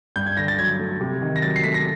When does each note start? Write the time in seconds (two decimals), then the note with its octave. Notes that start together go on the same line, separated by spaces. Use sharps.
0.16 G2 G6
0.26 G#6
0.37 D3 A#6
0.48 A6
0.58 F#3 G#6
0.79 A3
1.01 C3
1.22 D#3
1.36 A#6
1.42 F#3 A6
1.56 C7
1.64 A3 B6
1.74 A#6